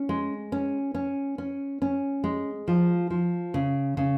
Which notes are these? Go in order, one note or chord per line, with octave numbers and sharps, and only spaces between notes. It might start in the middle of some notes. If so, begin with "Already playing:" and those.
Already playing: C#4
G#3
C#4
C#4
C#4
C#4
G#3
F3
F3
C#3
C#3